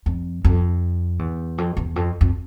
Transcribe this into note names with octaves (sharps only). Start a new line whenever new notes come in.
F2
F2
E2
F2
E2
F2
F2